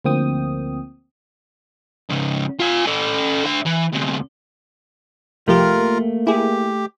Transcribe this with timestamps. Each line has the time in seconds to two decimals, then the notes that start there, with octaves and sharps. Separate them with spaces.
0.04 D2 F3 A#3 C4 G5 D#6
2.10 G#2 C#3
2.60 F4 G#5
2.86 C#4 A4
3.45 D3 E5
3.66 E3
3.93 D2 C3
5.48 C2 F3 A3 F4 G4 A#4
5.78 A#3
6.27 E4 G4 G#4